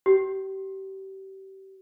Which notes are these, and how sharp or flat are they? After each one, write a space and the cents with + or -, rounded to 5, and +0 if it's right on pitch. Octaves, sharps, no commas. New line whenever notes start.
G4 -30